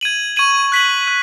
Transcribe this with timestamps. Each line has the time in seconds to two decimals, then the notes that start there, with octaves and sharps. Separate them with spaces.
0.01 G#6 D#7 F#7
0.36 C#6 G#6 D#7 F#7
0.72 F#6 B6 F#7
1.08 F#6